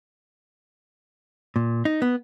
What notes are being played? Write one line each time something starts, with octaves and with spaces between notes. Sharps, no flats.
A#2
D#4
B3